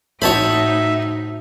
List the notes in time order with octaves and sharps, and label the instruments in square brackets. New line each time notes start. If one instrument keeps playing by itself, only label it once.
[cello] A2 D#4 [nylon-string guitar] F#4 C5 [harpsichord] C#5 A5 B5 [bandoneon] E5